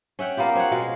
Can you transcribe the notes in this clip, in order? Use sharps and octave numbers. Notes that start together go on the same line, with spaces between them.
C#4 E5 F#5 G5
A#3 B3 F4 G4
C4 C#5 F#5
B2 G#3 F4